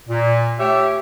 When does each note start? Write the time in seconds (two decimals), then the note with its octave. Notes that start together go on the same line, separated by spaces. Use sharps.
0.09 A#2
0.59 A3 G4 C#5 E5